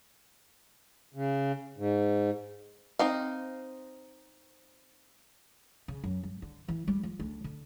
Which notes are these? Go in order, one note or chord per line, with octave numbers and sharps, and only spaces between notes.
C#3
G#2
C4 D#4 F5
C#3
F#2
G2
D3
E3
G3
F3
D2
D3